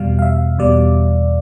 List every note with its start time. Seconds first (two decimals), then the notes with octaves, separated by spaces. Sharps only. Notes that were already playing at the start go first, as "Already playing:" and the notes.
Already playing: E2 B2 G3 F5
0.19 F5
0.22 E5
0.58 E2 B2 G3 D5